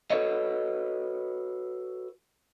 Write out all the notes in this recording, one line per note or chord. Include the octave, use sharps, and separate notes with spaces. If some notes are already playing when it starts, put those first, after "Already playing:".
F#4 A4 B4 C#5 D#5